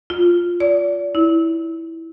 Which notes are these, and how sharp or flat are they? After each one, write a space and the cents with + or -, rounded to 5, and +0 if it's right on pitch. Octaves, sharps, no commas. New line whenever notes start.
F4 +0
D5 -35
E4 -10